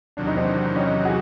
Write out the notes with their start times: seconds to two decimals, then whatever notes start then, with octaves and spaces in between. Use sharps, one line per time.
0.17 E2 C3 D#3 F#3 D4
0.27 D#4
0.37 C4 D4
0.75 C#4 D#4
1.05 F#4 G#4